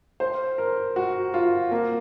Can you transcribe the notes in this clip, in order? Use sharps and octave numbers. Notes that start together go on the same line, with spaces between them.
C5
A#4
F#4
F4
A#3